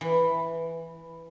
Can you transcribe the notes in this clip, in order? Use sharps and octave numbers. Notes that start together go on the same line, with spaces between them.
E3